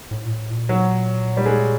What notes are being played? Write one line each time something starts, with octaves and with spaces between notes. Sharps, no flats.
A2
A#2
A2
A#2
F#3
G3
G#3